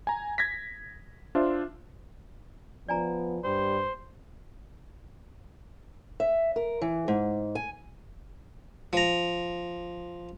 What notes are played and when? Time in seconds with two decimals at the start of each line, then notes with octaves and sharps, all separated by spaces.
0.07 G#5 A#5
0.38 G#6 A#6 B6
1.35 D4 F4 C5 E5
2.88 F3 B3 D5 G#5 A#5
3.44 G2 G3 C5
6.20 E5
6.56 A#4
6.82 E3
7.08 G#2
7.55 G#5
8.93 F3 A#5